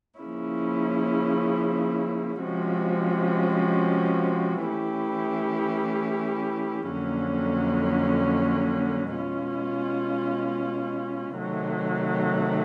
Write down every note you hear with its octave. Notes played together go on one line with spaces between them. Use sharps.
C#3 F3 A#3 C#4 E4
C3 F3 G#3 C#4 F#4
E3 A3 C#4 E4 G4
F2 D3 F#3 A#3 C#4
B2 G#3 C#4 F4
C3 D#3 F#3 A3